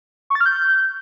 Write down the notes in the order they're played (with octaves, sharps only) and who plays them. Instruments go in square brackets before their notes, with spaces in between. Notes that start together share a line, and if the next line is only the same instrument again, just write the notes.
[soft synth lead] C#6
A6
F6
G6